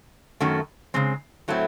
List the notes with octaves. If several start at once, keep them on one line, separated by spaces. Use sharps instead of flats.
F#2 D#3 A3 C#4 F#4
C#3 G#3 C4
A2 F#3 A3 C4 E4